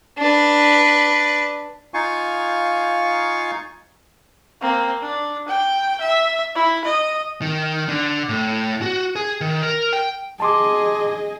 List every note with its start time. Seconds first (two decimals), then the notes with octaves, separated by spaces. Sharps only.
0.18 D4 B4
1.94 D#4 F4 F5 G#5 C#6
4.61 A#3 C4
5.02 D4
5.48 G5
6.01 E5
6.55 E4
6.85 D#5
7.42 D#3
7.89 D3
8.29 A2
8.82 F#4
9.16 G#4
9.41 D#3
9.63 A#4
9.93 G5
10.40 G#4 D#5 A5 C6 D6